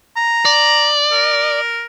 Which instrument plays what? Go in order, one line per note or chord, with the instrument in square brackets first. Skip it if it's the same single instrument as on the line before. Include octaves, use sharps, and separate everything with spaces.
[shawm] A#5
[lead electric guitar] D5
[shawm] A#4